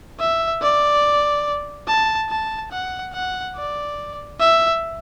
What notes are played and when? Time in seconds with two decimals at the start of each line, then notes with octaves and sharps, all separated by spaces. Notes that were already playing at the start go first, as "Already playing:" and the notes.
0.20 E5
0.62 D5
1.88 A5
2.30 A5
2.72 F#5
3.13 F#5
3.56 D5
4.39 E5